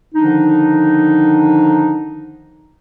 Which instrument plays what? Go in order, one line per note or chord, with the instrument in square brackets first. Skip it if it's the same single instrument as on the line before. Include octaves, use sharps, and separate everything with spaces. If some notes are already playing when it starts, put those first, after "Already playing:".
[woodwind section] D3 D#3 F3 D4 D#4